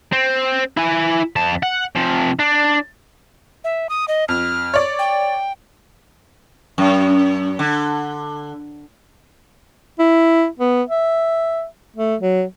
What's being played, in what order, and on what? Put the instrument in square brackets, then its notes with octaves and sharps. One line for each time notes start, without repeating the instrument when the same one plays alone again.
[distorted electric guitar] C4
E4 G#5
F2 A5
F#5
C3 F3
D4
[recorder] E5
D#6
D#5
[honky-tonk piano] F2 [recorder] F6
[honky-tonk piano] C#5 D5
[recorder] G5
[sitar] F#2
D3
[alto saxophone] E4
B3
E5
A3
F#3